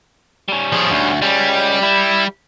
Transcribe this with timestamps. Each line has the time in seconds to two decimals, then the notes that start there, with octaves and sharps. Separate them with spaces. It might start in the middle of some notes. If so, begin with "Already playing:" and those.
0.48 G3 C#4
0.72 F3 G#4
0.90 D2
1.22 G3 G#3 C#4
1.83 E4